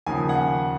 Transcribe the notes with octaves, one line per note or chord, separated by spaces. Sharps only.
D#2 C#3 F3 G#5
F#5